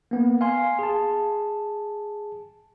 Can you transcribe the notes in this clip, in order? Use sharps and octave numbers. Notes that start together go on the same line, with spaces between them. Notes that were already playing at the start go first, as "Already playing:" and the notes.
A#3 B3
F5 G#5 C6
G#4 A5